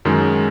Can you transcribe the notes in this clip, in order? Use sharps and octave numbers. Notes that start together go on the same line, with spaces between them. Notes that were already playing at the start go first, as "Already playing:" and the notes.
F#2 D#3 G#3